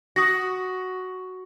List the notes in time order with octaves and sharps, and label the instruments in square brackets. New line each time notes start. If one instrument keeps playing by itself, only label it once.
[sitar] F#4 [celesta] D#6 A#6